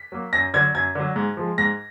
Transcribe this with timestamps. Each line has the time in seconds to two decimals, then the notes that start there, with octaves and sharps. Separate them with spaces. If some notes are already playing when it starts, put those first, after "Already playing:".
Already playing: B6
0.12 F#3 A#3
0.33 F#2 A#6
0.54 D3 F#3 G#6
0.75 F#2 G#6
0.95 D3 F#3
1.16 G#2
1.37 F3 G#3
1.58 G#2 A#6